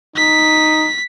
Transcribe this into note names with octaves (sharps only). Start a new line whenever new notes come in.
D#4 B6